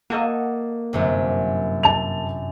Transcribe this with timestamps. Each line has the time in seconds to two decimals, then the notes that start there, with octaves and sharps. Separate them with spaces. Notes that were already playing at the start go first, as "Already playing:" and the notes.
0.10 A#3 F#4 A4 D#5
0.93 G1 F#2 C3
1.83 A5 F7